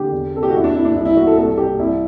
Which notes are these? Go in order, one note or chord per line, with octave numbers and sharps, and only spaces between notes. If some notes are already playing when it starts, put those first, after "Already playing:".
Already playing: D3 G4
E2
C3 A4
G4
F#4
E2 E4
D4
C3 E4
D4
C2 E4
E4
B2 F#4
A4
C2 A4
C3 G4
C2 E4